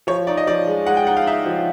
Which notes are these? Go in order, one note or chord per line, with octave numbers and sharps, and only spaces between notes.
F3 C#5
D#4 D5
D#5
F3 D5
G#3
G#3 F#5
G5
D#4 F#5
F5
D#4 E5
F3